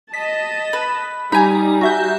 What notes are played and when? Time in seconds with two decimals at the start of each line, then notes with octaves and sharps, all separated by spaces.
0.14 D#5 A5 B6
0.73 B4
1.32 G3 D#4 G#5 A#5 B5
1.81 F#4 E5 G6